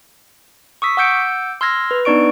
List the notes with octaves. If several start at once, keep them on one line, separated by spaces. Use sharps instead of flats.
C#6 D#6 E6 B6
F#5 D6 E6 G6 C#7 D7
C6 E6 F6 G#6 A#6
B4
B3 D4 D#4 D5 C#6 D7